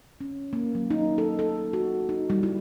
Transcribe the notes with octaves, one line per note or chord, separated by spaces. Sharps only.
C#4
A#3
F#3
D#4
A4
A4
F#4
D#4
G3
E4